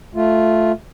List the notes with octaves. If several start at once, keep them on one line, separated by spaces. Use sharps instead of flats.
A3 F4